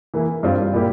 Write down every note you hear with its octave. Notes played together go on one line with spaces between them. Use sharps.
E3 A#3 E4
G2 G3 C4 F4
A#2 G3 A#3 E4 G4